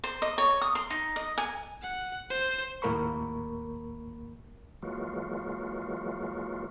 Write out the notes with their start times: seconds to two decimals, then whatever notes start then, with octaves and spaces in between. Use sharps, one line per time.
0.04 C5
0.22 D#5
0.38 C#5
0.62 D#6
0.75 C6
0.90 D#4
1.16 D#5
1.38 G#5
1.82 F#5
2.30 C5
2.82 D#2 A2 A#3 A#4 B5 C#6
4.82 E3 F#3 G#3 A#3 F4 F#4